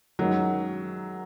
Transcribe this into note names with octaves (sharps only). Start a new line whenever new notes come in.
F#2 D#3 F#3 G#3 D#4